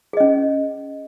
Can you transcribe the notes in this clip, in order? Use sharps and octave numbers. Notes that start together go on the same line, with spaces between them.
C#4 G#4 D#5